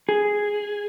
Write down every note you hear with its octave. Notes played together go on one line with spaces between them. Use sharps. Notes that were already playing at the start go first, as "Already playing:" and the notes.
G#4